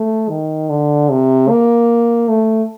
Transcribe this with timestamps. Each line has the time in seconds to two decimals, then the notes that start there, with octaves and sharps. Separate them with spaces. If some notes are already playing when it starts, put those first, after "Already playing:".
Already playing: A3
0.30 D#3
0.70 D3
1.10 C3
1.50 A#3
2.28 A3